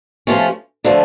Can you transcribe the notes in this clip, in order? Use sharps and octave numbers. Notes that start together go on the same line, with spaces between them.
C3 F3 A3 C#4 F4
D3 F3 A3